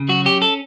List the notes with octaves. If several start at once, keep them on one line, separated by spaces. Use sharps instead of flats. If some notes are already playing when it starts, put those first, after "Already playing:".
Already playing: C#3
F#3 F#4
C#4 G4
A4